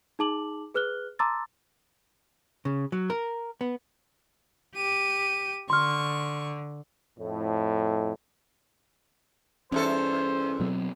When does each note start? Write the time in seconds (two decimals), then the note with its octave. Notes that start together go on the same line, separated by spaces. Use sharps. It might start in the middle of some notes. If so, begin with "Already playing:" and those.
0.19 D#4 G#4 A5 D6 F#7
0.74 G#4 B4 F6 F#6 G7
1.19 A5 A#5 C6 D6 E6 A6
2.65 C#3
2.92 F#3
3.10 A#4
3.61 B3
4.76 G4 D#7
5.70 D3 C6 C#6 F6
7.19 F2 A2
9.72 E2 G2 C#4 A4 C5
10.60 B2 F#3 C4